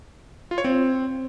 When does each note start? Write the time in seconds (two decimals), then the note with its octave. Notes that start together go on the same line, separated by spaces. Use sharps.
0.51 F4
0.58 C#5
0.64 C4